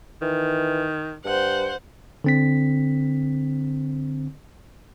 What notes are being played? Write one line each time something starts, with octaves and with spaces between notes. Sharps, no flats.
D#3 E3
G2 C5 F#5
D3 C4 B6